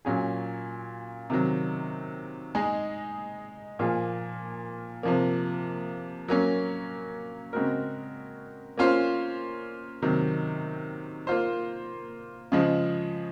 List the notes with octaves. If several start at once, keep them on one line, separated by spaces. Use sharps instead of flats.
A#2 F#3 C#4 G#4
C3 D#3 F#3
G#3 D#4 G#4
A#2 F3 A#3 F4 G#4
C3 F3 A#3
F#3 A#3 C#4
C#3 G#3 C4 F#4 A#4
A#3 C#4 F4 C5
C3 D#3 F#3
A#3 F4 C5
C#3 F3 G#3